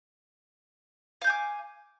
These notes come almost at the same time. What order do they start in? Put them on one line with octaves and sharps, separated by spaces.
F5 G6 G#5 D6